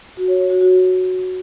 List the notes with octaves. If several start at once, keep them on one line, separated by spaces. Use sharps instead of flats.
F#4
C#5
C#5
F#4
F#4